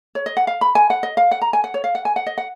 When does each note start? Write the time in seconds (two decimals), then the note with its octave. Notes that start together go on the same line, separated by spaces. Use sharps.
0.15 C#5
0.26 D#5
0.37 F#5
0.47 F5
0.61 B5
0.75 G#5
0.90 F#5
1.03 D#5
1.17 F5
1.31 F#5
1.42 A#5
1.53 G#5
1.64 F#5
1.74 C#5
1.84 F5
1.95 F#5
2.05 G#5
2.16 F#5
2.27 D#5
2.38 F#5